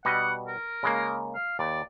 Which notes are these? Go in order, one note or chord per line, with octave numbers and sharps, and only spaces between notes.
B2 G3 D#5 F#5
A#4
C#3 G#3 A#3
F5
D#2 D5